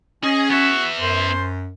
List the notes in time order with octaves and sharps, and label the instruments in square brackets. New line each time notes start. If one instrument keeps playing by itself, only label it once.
[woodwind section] C#4 [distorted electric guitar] G#4 [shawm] D#5
[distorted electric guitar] B3 E5 [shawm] F#4
[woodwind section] F#2 [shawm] C5